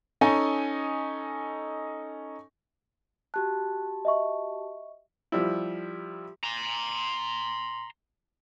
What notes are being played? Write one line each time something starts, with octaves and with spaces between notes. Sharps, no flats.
C#4 D#4 A4 D#5 G#5
F#4 G4 A5 F#6
D#5 E5 C#6
F3 G3 E4
A#5 C6